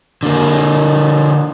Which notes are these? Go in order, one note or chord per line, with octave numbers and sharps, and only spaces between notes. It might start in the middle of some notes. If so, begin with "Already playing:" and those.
D3 A#3